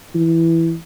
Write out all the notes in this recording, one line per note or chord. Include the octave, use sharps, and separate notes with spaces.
E3